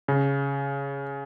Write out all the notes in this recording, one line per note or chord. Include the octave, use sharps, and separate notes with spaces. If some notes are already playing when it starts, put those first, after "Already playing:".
C#3